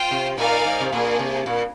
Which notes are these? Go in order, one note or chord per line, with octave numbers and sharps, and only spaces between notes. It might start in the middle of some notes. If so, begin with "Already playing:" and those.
Already playing: F4 C5 G5
C3
A#2 D#4 A#4 D5 F5 G#5
G#2
C3
A#2 A#3 D4 G#4
C3
A#2